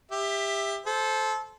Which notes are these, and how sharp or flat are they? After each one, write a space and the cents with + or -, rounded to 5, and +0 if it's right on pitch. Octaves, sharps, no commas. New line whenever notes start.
G4 +25 E5 +0
A4 -20 C5 +0